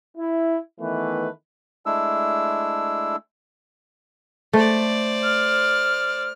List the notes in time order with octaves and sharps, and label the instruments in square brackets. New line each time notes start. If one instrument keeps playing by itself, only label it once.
[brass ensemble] E4
D#3 E3 A3 B3 B4
[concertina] G#3 A3 D4 E4 E6
[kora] A3 [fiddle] C5 D5
[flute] F6